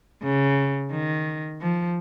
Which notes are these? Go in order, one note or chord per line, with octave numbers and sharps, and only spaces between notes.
C#3
D#3
F3